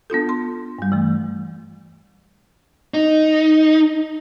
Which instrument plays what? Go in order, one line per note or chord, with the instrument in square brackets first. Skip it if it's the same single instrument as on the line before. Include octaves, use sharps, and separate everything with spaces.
[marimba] B3 D4 F4 A4
C6
G2 G3
E3 A3
[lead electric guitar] D#4